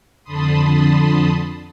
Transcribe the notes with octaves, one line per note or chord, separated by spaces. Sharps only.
F2 D3 A5 B5 C6 D#6